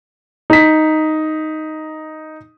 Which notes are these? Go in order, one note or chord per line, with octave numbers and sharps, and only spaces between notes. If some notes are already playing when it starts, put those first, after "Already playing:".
D#4 B6